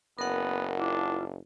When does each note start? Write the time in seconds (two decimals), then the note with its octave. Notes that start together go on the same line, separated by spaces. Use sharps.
0.19 F#1 B3 A#4 F#5
0.79 D4 E4 F4